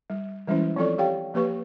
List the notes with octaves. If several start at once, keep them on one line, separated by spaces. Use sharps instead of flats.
G3
E3 G3 G#3 C#4 E4 C5
F3 C4 F4 A4 D5
G4 C#5 F5 G5
F3 A#3 G4 B4 C#6